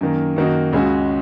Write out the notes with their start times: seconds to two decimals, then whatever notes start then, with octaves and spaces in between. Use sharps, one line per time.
0.01 F#2 D#3 A#3
0.36 F#2 D#3 A#3 D#4 F#4
0.73 C#2 C#3 G#3 C#4 F#4